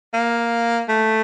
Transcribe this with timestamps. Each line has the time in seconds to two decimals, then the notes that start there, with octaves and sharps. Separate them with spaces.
0.14 A#3
0.89 A3